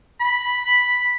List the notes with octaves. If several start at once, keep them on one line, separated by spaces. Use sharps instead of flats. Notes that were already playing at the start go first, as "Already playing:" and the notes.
B5